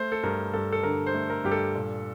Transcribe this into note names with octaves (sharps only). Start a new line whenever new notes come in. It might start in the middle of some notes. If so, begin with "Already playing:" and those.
Already playing: A3 C5
A4
G2 A#4
G2 A4
A4
D3 A#4
C5
A3
A#4
G2 G4
A4
A#2